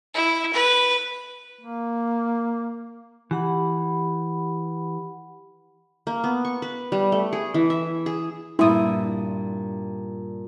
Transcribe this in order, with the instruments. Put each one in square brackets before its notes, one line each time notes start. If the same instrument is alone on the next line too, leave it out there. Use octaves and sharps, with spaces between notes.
[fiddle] E4
B4
[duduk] A#3
[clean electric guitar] E3 [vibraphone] G4 F#5 B5
[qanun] A#3
B3
C#6
B4
G3
A3
G#4
E3
E5
G#4
[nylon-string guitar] G2 A#2 [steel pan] E4 D#6